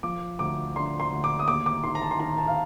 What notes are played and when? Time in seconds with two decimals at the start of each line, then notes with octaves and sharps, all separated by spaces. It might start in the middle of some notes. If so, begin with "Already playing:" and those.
0.03 F3 D6
0.39 D2 D6
0.76 D3 C6
1.00 C6
1.12 D2
1.24 D6
1.39 D#6
1.48 D#2 D6
1.66 D6
1.84 D#3 C6
1.95 A#5
2.02 A5
2.11 C6
2.20 D#3 A#5
2.38 A5
2.48 F5